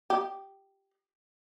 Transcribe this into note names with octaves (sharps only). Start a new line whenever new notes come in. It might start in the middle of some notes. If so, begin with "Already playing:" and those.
G4